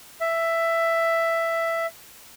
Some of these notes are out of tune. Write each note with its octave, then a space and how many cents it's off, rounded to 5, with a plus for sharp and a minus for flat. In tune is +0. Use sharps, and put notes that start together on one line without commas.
E5 +10